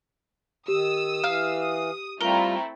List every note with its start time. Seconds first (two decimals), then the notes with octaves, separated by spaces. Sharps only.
0.68 D#3 G4 D#6 E6
1.24 E3 F5
1.60 D#6
2.21 G3 A3 C4 E4 F4 A#4 G7